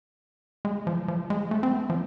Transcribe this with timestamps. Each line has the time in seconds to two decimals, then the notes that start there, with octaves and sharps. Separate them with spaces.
0.65 G#3
0.87 F3
1.08 F3
1.30 G#3
1.51 A3
1.63 C4
1.73 B3
1.90 F3